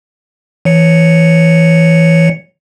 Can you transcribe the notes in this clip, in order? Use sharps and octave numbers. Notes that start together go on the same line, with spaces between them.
E3 C#5 C#7